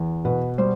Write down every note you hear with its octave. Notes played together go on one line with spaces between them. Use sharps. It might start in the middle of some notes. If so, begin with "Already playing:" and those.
Already playing: E2
B2 B4
G3 C5